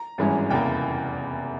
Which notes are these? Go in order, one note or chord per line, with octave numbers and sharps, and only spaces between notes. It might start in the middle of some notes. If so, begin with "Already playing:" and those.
Already playing: A#5
G#1 G2 E3 G#3 C#4
F1 E2 C#3 E3 A#3 G5